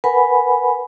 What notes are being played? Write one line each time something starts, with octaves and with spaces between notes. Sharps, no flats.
A#4 B4 F#5 G#5 B5